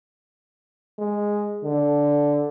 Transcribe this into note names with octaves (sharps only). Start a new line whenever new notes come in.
G#3
D3